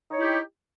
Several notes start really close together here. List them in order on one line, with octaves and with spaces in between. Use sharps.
D#4 C#5 E4 G4